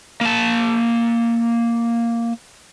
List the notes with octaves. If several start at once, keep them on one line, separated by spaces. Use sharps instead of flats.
A#3 A5